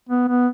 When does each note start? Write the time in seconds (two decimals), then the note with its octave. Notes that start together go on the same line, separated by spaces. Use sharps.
0.09 B3
0.28 B3